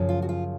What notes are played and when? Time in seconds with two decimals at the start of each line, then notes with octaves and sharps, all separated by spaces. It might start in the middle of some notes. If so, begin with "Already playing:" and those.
Already playing: F#2 C#3 F3
0.09 F4
0.22 F#4
0.29 F4